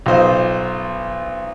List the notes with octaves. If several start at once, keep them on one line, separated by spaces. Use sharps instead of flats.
B1 F4 C5 D#5